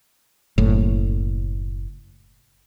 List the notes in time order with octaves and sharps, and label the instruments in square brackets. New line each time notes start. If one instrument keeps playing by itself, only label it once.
[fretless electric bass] F#1 A2